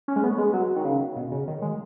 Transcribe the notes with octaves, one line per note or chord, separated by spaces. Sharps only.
C#4
G#3
B3
G#3
F#3
D#3
C#3
B2
C#3
D#3
G#3